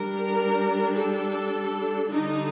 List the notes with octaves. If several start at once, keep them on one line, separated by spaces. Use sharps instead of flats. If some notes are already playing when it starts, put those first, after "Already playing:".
Already playing: G3 D4 A#4
A4
D3 G3 D4 D#4